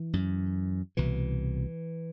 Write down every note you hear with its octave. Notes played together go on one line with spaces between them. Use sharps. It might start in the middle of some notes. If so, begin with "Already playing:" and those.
Already playing: E3
F#2
C2 B2 E3